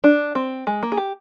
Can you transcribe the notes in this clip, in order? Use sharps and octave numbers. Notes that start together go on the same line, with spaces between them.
D4
C4
G#3
A#3
G#4
G4